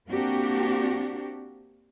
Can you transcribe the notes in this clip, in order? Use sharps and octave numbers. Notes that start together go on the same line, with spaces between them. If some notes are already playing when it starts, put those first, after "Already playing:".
A#3 C4 D4 F#4 G4